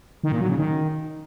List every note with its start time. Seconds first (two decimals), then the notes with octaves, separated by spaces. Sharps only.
0.24 D#3
0.32 A#2
0.41 F#3
0.49 C#3
0.58 D#3